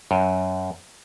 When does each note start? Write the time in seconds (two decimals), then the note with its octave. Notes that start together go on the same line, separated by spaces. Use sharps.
0.11 F#2